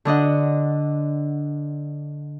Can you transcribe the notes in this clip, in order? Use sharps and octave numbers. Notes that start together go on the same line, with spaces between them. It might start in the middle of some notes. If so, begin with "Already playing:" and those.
D3 D4 D#5 F#5